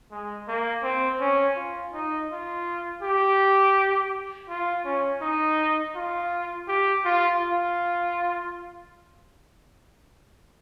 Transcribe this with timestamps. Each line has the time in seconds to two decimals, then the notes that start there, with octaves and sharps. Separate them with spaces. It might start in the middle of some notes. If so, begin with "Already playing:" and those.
0.11 G#3
0.48 A#3
0.83 C4
1.20 C#4
1.56 F4
1.94 D#4
2.30 F4
3.03 G4
4.49 F4
4.85 C#4
5.21 D#4
5.95 F4
6.68 G4
7.05 F4
7.40 F4